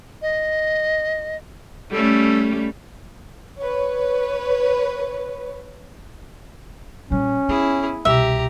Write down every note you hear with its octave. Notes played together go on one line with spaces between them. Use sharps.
D#5
G3 A3 C#4 A4
B4 C#5
A#2 G3 C#4
B3 E4 G#4
C2 B2 G4 E5 A#5